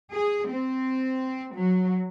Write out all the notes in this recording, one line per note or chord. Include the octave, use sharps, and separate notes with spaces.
G#4
C4
F#3